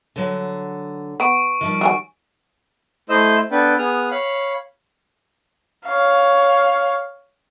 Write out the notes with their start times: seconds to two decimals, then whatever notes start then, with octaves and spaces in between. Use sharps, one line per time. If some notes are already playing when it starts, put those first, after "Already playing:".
0.16 D3 F#3 F#5
1.20 B3 C#6 D7
1.61 D#3 F3 G3
1.81 F#3 F4 G#5
3.09 A3 E4 C5 D#5 E6
3.51 B3 D4 A4 B4 G5
3.79 B3 G#4 D#6 F6
4.11 C#5 F5 B5
5.85 C#5 F5